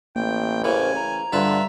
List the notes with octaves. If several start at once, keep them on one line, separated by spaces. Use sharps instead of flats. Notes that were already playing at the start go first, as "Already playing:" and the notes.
A1 A#3 G5
C#3 E3 A#4 C5 G#5
A#5
G2 D3 F4 B4 E5